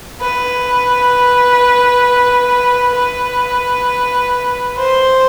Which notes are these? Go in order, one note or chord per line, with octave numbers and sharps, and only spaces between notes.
B4
B4
C5